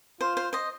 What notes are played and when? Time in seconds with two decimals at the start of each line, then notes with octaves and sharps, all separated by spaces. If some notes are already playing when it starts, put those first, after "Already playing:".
0.21 F4 C5
0.37 C5
0.53 C5 D#5